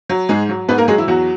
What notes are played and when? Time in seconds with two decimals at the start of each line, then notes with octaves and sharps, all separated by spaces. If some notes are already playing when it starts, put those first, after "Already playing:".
0.10 F#3
0.29 G#2 G#3 G#4
0.49 F#3
0.68 G#2 B3 B4
0.78 A#3 A#4
0.88 F#3 G#3 G#4
0.98 E3 E4
1.08 E2 F#3 F#4